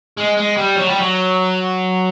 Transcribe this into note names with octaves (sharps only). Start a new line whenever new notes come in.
G#3
G#3
G3
F#3
G3
F#3